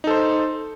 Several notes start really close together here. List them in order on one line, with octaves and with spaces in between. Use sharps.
D#4 A4 C5